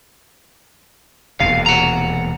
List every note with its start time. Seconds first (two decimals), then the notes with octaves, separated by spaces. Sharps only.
1.40 E1 D#2 C3 F5
1.66 F#5 A#5